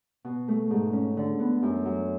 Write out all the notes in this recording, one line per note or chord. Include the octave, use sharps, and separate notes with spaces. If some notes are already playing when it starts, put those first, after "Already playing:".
B2
A3
G#2
C#4
D3
B3
F#2
F#3